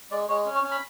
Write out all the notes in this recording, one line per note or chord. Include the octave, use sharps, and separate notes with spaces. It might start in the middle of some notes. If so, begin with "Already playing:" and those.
G#3 D5
G#3 C#5
C#4
C#5
C#4
B5